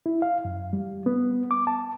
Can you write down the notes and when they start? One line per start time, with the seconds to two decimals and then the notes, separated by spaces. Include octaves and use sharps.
0.06 E4
0.22 F5
0.45 F#2
0.73 G3
1.06 B3
1.51 D6
1.67 A5